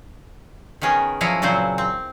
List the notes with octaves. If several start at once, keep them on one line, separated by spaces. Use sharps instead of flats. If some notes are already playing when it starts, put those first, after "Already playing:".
D#3 B3 C#4 G#4 A#4
F3 F#3 E4 C#5 D#5 F5
A#2 C#3 F#3 C4 C5
C4